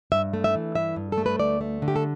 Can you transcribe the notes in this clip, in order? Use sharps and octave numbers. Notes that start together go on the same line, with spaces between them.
G2 E5
A3
E5
E3
G2 E5
G2
A4
A3
B4
D2 D5
A3
D3
G4
A4